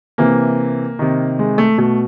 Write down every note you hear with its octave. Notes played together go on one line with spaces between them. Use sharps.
C3 E3 A#3
C3 D#3
G#3
A3
B2 A3